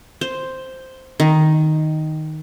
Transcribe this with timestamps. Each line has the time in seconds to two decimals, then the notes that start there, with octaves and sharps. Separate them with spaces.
0.21 C5
1.20 D#3